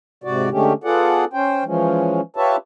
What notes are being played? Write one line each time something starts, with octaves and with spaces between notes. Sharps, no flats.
G#2 C3 F#4 D5
D3 G#3 A3 C#4 G4
B3 F4 G#4 A4 D5 F#5
C#4 C5 G5
E3 F3 G#3 C#4
F4 G4 B4 C#5 E5 A5